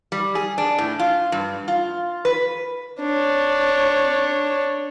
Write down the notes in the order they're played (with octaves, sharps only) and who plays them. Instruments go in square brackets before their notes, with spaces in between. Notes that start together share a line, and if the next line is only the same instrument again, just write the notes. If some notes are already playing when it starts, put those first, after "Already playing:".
[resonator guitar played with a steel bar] G3
G#4
D4
A2
F4
G2
F4
B4
[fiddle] D4 C#5